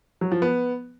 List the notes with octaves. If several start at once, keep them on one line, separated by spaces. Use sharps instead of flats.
F#3
F3
B3